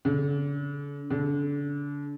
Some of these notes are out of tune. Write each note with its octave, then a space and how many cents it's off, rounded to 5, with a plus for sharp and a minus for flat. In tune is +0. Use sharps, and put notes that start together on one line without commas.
D3 -45
D3 -35